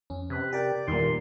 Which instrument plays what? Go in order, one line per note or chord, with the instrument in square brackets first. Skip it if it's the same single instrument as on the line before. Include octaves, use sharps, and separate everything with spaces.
[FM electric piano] F2 C#4
[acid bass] C3 [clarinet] B4
[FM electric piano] G4 A#4 G5 [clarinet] D5
[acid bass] E2 [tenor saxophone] A#2 [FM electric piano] D#3 G3 [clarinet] C6